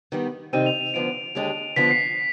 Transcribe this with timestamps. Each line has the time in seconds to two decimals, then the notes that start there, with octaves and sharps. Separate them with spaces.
0.12 D#3 G3 B3
0.53 C3 D#3 G3 C4 D#4 D#7
0.66 F7
0.81 D#7
0.94 D2 D3 F3 B3 F4 D7
1.35 D#2 D3 G#3 D4 G4
1.76 D3 F3 B3 D4 F4 B6
1.91 C7